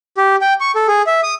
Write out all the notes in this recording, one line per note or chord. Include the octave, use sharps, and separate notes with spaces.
G4
G5
C#6
A4
G#4
E5
D#6